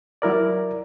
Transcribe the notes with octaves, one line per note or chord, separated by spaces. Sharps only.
F#3 E4 A#4 D5